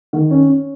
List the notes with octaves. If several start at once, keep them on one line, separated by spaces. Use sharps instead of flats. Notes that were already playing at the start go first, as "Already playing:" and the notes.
D#3
C#4
C#4